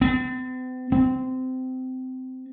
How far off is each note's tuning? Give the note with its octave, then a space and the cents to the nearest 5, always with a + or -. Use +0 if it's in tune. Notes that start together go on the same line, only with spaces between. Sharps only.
C4 -45
C4 -20